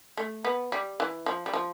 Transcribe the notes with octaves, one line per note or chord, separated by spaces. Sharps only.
A3
B3
G3
E3
F3
G3
F3